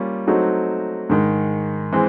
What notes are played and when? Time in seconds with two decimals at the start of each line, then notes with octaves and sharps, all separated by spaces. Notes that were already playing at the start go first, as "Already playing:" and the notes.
Already playing: G3 A#3 C#4 F4
0.27 F#3 A3 C4 D#4 F#4
1.09 G#2 D#3 G#3
1.92 E3 G#3 C4